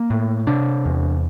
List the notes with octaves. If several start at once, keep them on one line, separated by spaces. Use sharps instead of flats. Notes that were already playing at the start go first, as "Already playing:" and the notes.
Already playing: A#3
A2
C3 D4
E2